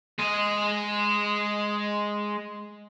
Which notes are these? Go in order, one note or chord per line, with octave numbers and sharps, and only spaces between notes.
G#3 D#5